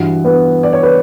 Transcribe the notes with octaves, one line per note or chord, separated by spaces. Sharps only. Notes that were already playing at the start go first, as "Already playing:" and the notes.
Already playing: G2 E3 F#4 F#5
B3 B4
D5
C#5
B4